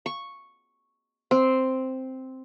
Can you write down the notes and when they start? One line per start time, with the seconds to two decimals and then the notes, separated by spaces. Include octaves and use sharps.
0.06 C#6
1.31 C4